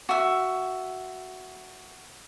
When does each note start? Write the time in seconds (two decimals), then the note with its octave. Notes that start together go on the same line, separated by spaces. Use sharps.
0.09 F#4 E5